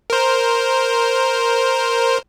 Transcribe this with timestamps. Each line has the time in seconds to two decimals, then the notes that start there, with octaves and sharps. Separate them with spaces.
0.10 A#4 C5